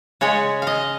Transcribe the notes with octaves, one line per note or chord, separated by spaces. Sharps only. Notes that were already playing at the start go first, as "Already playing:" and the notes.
C#3 G#3 C#5
D#5 F5